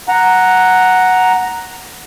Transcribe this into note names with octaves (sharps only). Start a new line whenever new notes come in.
F#5 A#5